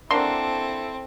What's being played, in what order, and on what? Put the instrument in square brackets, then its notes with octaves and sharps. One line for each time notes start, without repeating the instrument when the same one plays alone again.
[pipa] A#3 D4 F#4 [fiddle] C4 [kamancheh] E4 A4 [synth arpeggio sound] C6